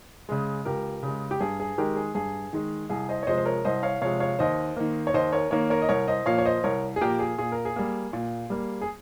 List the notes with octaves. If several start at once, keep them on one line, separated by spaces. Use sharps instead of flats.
C#3 G#3
C#2 G4 A#4
C#3
G#3
G4
G2 G#4
G#4
D#3 G#3 G4 A#4
G#4
G2 G#4
D#3 G#3
C2 G#4
C5 D#5
C#5
C3 F3 G#3 C5 D#5
C5
A#4 C#5
C2 C5 D#5
C#5 F5
C3 F3 G#3 C#5 F5
C#5 F5
D#2 C5 D#5
D#3 A#3
C#5
D#2 C5 D#5
A#4 C#5
D#3 A#3 A#4 C#5
A#4 C#5
D#5
C2 A#4 C#5
C5 D#5
A#2 F3 A#3 C#5 F5
C#5
C5 D#5
C2 A#4 C#5
G#4
A#2 F3 A#3 G4 A#4
G#4
A#2 G#4
A#4
G#4
G3 A#3
A#2
G3 A#3
G#4